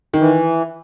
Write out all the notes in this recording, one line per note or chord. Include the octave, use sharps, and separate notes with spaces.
D#3
E3